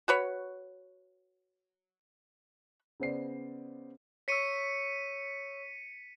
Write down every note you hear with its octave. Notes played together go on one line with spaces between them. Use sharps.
F#4 B4 C#5
C#3 B3 C5 D5 C7
C#5 C#6 E6 B6 C#7 D#7